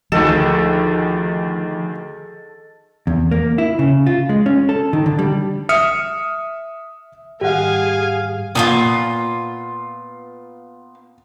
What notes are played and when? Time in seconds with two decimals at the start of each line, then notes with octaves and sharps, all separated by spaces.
0.12 D2 D#3 F3 G#4 A4 D#5 E7
3.07 E2
3.31 A#3
3.58 E4
3.79 C#3
4.06 F4
4.29 G#3
4.46 C#4
4.69 A4
4.93 D#3
5.06 D3
5.19 G3
5.69 E5 D#6 F6 C#7
7.41 G#2 D#3 G3 G4 G#4 F5 F#5 G#5
8.55 A#2 B3 D4 F4